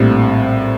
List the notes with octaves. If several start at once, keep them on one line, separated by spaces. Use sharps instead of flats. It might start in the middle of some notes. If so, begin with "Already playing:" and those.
Already playing: A#1 A2 G3 C4